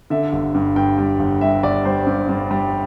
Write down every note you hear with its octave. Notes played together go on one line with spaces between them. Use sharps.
D3 E5
G1
G2
G2 G5
G3
G1
G3 E5
G1 D5
G3 C5
G2
G2
G3